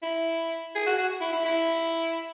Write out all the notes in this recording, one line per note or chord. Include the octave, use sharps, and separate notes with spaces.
E4
G#4
F#4
F#4
E4
E4
E4